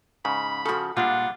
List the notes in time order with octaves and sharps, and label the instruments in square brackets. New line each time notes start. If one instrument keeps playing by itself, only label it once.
[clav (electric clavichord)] G#2 C#3 [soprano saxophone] B5
[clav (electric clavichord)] C#3 F3 [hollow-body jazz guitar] F#4 A4
[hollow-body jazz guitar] A#2 [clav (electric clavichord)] G3 G#3 D4 [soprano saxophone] F4 [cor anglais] F#5